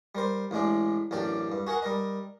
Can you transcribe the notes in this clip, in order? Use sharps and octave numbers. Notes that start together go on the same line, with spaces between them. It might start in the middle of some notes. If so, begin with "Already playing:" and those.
G3 A#4 C5
A1 A2 G#3 D4
A1 F#2 D4 G4 D5
G2
F#4 G#4 A#4 F#5
G3 A#4 D#5